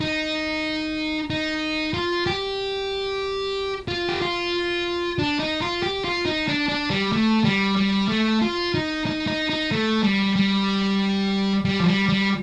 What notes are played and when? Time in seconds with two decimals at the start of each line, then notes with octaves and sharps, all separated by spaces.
0.01 D#4
1.30 D#4
1.94 F4
2.26 G4
3.88 F4
4.09 G4
4.22 F4
5.19 D4
5.39 D#4
5.61 F4
5.83 G4
6.04 F4
6.26 D#4
6.48 D4
6.68 D4
6.90 G3
7.12 A3
7.44 G3
7.76 G3
8.09 A3
8.42 F4
8.74 D#4
9.06 D#4
9.28 D#4
9.50 D#4
9.71 A3
10.03 G3
10.36 G3
11.65 G3
11.80 F3
11.86 G3
12.09 G3